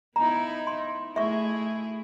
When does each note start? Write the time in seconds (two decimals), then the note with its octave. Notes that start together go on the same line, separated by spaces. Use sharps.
0.16 B3 D#4 E4 A#5
0.67 C6
1.16 A3 E4 G#4 E5 C#6